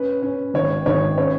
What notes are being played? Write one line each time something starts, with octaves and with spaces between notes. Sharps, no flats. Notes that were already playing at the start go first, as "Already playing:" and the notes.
Already playing: C#4 B4
C#4
G#1 C#5
G#1 C#5
C#4 C#5